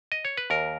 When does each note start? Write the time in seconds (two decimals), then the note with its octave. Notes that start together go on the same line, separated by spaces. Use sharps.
0.12 D#5
0.25 C#5
0.37 B4
0.50 D#2 A#4